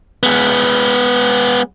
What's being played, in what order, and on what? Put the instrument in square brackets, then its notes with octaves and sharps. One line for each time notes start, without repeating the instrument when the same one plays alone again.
[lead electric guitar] G#3 B3